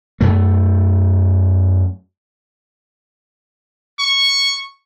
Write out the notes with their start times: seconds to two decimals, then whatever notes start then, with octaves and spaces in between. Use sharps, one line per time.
0.21 F#2 A3
3.99 C#6